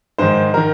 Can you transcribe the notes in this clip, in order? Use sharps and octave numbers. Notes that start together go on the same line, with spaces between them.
G#2 D#3 C5
D#3 A#4